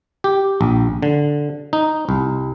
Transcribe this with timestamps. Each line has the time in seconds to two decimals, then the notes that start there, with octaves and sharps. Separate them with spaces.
0.24 G4
0.61 A#1
1.03 D3
1.73 D#4
2.09 C2